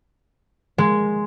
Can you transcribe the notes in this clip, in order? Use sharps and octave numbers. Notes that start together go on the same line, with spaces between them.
G#3